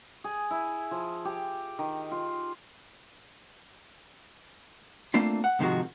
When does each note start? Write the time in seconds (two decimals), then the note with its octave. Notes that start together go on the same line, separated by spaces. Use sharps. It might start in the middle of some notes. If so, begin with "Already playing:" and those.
0.24 G#4
0.51 E4
0.91 F3
1.25 G4
1.79 D#3
2.11 F4
5.14 A3 A#3 C4 D4 F4
5.44 F#5
5.59 G#2 C3 D#3 F3 G#3 F#4